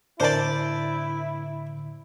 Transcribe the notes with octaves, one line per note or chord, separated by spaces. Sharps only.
A2 D3 D4 E4 A#4 C5 D5 A5